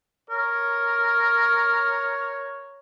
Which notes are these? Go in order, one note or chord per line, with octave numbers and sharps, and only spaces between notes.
A#4 C#5